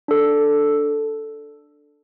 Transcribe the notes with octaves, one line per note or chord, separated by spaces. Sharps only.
D4 A4